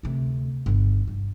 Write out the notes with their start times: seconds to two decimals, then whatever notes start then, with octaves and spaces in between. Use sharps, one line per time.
0.03 D2 C3
0.66 G1 D3
1.07 G2